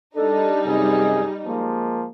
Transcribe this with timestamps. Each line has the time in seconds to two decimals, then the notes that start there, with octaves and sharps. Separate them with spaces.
0.16 G3 D4 D#4 A4
0.66 F#2 C3 G#4
1.46 F3 G#3 A#3